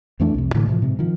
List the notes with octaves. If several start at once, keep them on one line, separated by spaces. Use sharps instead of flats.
F2 E3 A3 D4
C2 F2 C3
A2 D3 E3 A3
A2 C3 E3 F3
G#2 C3
D#3 F3